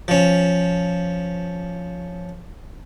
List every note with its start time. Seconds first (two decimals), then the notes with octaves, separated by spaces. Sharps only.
0.08 F3 C#4